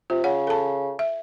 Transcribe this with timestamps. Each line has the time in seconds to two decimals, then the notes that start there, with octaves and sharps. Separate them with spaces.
0.10 C3 F4
0.24 C#3 C#5 F#5
0.47 A4 A5
0.99 E5